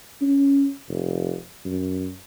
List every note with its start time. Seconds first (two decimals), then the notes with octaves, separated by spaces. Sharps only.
0.21 C#4
0.88 F1
1.65 F#2